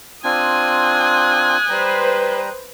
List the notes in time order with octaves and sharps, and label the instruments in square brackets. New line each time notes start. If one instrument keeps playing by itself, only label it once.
[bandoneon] C4 D4 F4 [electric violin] G#5 [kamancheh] D#6 F#6
[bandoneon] G3 G5 A#5 [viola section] B4 C5